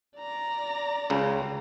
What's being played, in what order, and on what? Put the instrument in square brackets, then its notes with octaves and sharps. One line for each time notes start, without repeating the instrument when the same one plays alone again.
[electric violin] D5 A#5
[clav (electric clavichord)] C#2 C#3